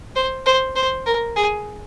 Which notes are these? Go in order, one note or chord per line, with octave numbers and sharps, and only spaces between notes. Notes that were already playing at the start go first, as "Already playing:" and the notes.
C5
C5
C5
A#4
G#4